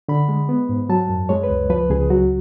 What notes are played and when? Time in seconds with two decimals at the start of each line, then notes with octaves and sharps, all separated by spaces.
0.09 D3 B5
0.29 G#3
0.49 B3
0.69 G#2
0.89 F#3 A5
1.09 F#2
1.29 G#3 C#5
1.43 B4
1.49 C#2
1.70 F3 B4
1.90 C#2 G#4
2.10 F#3 F#4